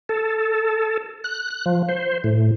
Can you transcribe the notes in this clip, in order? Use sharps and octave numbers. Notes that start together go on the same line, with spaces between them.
A4
F#6
F#6
F3
C5
A2